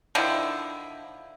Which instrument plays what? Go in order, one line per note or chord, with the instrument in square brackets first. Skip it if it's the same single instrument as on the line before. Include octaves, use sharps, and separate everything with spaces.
[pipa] D3 D#3 F3 E4